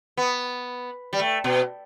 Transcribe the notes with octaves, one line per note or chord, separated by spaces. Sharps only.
B3
G3
A3
B2